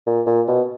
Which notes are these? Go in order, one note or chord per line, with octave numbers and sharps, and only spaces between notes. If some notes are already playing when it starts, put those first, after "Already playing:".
A#2
A#2
B2